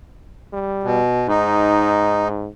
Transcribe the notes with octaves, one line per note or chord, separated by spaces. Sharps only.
G3
B2
G#2 D#4